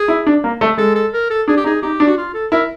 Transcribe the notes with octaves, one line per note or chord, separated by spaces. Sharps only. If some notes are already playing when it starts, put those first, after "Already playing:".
Already playing: G#4
E4
D4
A#3
A3
G#3 A4
A4
A#4
A4
D4 G#4
G4
D#4 G#4
D#4 G4
D4
F#4
F4
A4
E4 A#4